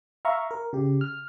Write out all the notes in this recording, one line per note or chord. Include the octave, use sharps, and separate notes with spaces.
E5 F5 A#5 C#6
A#4
C#3 G4
F6